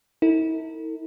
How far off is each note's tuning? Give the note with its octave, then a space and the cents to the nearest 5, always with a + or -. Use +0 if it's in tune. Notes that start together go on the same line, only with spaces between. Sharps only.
E4 -40 A4 +45